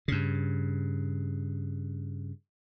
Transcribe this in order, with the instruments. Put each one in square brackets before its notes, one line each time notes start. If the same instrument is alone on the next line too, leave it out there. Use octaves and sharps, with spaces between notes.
[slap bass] G2 C#3